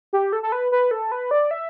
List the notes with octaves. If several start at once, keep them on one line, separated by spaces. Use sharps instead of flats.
G4
A4
A4
B4
B4
A4
B4
D5
E5